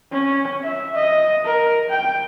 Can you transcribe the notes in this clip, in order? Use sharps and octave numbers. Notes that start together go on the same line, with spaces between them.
C#4
E5
D#5
A#4
G5